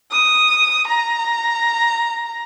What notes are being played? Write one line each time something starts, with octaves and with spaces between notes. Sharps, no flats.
D#6
A#5